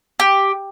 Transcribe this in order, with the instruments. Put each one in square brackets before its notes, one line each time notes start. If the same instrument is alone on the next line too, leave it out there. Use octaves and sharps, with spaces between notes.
[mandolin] G4